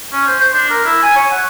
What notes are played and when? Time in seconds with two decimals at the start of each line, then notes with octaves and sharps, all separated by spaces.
0.13 C#4
0.27 C5
0.40 C5
0.54 D4
0.70 A#4
0.85 E4
1.03 G#5
1.15 C#5
1.31 F#5